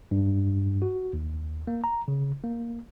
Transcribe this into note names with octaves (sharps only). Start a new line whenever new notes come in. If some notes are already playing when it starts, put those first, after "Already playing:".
G2
F#4
D#2
A#3
A#5
C#3
A#3